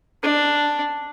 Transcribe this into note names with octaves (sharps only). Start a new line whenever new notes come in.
D4